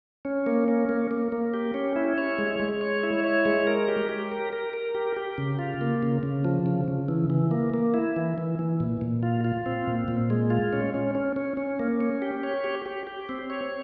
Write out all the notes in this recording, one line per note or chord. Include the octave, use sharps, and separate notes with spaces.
C#4
A#3
C#4
A#3
A#3
A#3
G4
C#4
E4
C#5
G#3
G#3
C#5
E4
C#5
G#3
A#4
G4
G4
A#4
A#4
A#4
G4
G4
C#3
F4
A#3
C#3
C#3
F3
C#3
C#3
E3
E3
A#3
A#3
E4
E3
E3
E3
A#2
A#2
F4
F4
C4
A#2
A#2
G#3
F4
C#4
C#4
C#4
C#4
C#4
A#3
C#4
G4
C#5
G4
G4
G4
C4
C#5